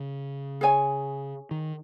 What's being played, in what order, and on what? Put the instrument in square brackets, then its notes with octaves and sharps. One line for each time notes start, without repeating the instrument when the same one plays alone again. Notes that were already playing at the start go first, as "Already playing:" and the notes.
Already playing: [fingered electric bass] C#3
[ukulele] G#4 C#5 G#5
[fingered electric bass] D#3